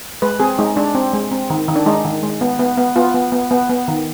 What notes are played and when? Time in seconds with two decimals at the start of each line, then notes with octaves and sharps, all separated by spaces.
0.22 G#3 B4
0.40 C4 G#4
0.58 G#3 D#4
0.76 G#3 D4
0.95 C4
1.13 G#3
1.31 C4
1.50 D#3
1.68 D#3
1.76 D4
1.86 G#3 D#4
2.05 D#3
2.23 G#3
2.41 B3
2.59 B3
2.77 B3
2.96 B3 F4
3.14 B3
3.32 B3
3.51 B3
3.70 B3
3.88 D#3